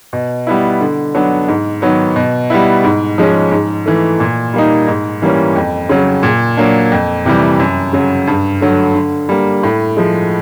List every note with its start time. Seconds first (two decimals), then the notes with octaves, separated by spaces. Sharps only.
0.13 B2
0.47 G3 B3 E4
0.81 D3
1.15 F#3 B3 D4
1.48 G#2
1.82 D#3 F#3 B3
2.16 B2
2.50 G3 B3 E4
2.84 G#2
3.18 F3 G#3 C#4
3.51 G#2
3.86 E3 A3
4.20 A#2
4.54 G3 A#3 D#4
4.88 G#2
5.22 E3 G3 A#3 C#4
5.56 F2
5.89 C#3 F#3
6.23 A#2
6.57 F#3 A#3 D4
6.92 F2
7.25 C3 E3 G3
7.59 F#2
7.93 C#3 F#3
8.27 G2
8.61 D3 F#3 A3
8.95 D3
9.29 G3 A#3
9.63 A2
9.97 F3 G#3